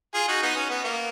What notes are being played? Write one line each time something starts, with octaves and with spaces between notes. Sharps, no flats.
F4 G#4
D#4 F#4
B3 D#4
C#4
B3
A#3